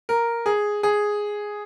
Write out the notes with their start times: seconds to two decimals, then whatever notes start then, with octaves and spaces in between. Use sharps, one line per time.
0.09 A#4
0.46 G#4
0.83 G#4